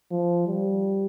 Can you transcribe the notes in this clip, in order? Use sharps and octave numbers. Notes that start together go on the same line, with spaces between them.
F3
G3